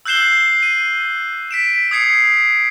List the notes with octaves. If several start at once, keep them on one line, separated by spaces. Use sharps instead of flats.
E6 F#6 G6 C7 E7 G7
D#7
B6 D7 E7
D#6 G#6 C7 C#7